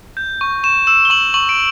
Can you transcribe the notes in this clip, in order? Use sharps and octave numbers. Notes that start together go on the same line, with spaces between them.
G6
C#6
C#6 E7
E6 E7
G7
C#6 F#7
C#6 F#7
D7